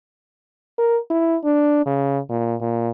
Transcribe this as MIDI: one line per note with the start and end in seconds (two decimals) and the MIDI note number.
0.78 0.98 70
1.10 1.36 64
1.44 1.83 62
1.86 2.19 49
2.30 2.55 46
2.61 2.90 46